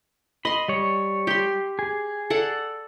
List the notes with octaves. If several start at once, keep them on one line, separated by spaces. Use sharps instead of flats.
D#5 B5 C6
G3 C#5
G4 C6
G#4
A4 D5 F#5